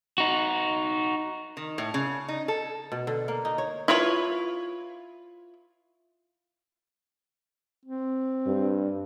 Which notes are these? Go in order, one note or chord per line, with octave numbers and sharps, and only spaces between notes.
D#4 F#4
D#3
A2
C#3
D#4
A4
B2
D3
A#3
D#4
C#5
E4 F4 B4 C#5
C4
G2